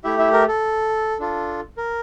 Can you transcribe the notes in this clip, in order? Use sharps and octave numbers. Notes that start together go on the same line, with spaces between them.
A3 E4 G4 E5
E4 E5
A#4
A4
D4 F4 A4
A#4